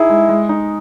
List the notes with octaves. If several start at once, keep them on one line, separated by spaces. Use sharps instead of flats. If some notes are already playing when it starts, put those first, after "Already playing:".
Already playing: D#4 E4 G#4
G#3
G#3
D#4